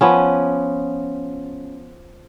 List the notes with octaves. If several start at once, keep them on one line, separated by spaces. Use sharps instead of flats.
F3 B3 C#4